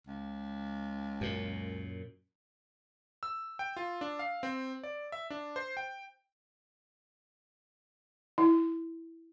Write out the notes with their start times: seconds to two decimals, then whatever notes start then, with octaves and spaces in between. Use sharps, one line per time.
0.07 C#2
1.21 F#2 A#2
3.23 E6
3.59 G5
3.77 F4
4.01 D4
4.19 F5
4.43 C4
4.84 D5
5.12 E5
5.30 D4
5.56 C5
5.77 G5
8.38 E4